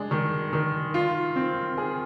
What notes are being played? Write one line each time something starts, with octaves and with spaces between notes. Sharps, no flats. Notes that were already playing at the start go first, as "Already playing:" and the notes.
Already playing: G#3 D4
D#3
D#3
F4
C4
G#4